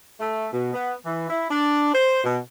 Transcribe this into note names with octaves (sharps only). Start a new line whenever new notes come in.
A3
B2
B3
E3
E4
D4
C5
B2